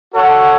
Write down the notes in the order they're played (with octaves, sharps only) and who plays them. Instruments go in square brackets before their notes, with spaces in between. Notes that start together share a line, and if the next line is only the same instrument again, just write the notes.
[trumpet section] F#4 A4 C#5 F#5